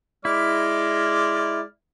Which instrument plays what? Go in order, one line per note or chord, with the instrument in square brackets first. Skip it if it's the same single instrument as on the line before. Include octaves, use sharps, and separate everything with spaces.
[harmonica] G#3 D5 F6 [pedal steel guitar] E4